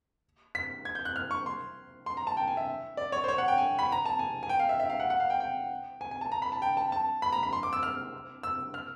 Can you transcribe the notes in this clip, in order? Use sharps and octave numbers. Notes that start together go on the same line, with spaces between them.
B6
G#6
G6
F#6
F6
C#6
C6
C6
A#5
A5
G5
G#5
E5
D5
C#5
C5
C#5
F#5
G5
G#5
B5
A#5
A5
G#5
G#5
G5
F5
E5
E5
F5
F#5
F#5
F5
G5
G5
G#5
G#5
A5
A#5
B5
A5
G5
A5
A5
B5
A#5
B5
C6
D6
E6
F6
E6
F6